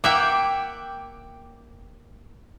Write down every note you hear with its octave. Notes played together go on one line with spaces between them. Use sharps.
A#3 E5 F#5 G5 D6